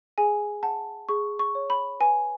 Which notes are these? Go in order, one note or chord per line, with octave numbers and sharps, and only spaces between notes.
G#4 G#5
F#5 A5
G#4 C#6
C#6
C#5
B5
B4 G#5